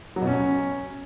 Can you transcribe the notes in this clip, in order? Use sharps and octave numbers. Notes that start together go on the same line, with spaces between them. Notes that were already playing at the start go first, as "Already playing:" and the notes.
F#3
B2
C#4